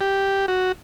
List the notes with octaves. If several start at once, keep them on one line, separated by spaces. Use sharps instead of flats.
G4
F#4